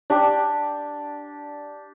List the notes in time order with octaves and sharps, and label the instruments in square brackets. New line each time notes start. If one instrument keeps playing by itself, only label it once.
[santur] D4 G4